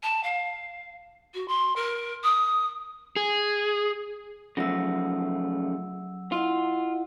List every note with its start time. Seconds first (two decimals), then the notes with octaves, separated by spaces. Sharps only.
0.03 A5
0.23 F5
1.34 F#4
1.48 C6
1.76 A#4
2.23 D#6
3.16 G#4
4.57 C#3 F3 F#3 A3 E6
6.32 E4 F4 D#5 F#5